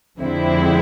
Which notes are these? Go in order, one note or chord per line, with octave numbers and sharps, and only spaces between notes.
F2 D3 G#3 C4 E4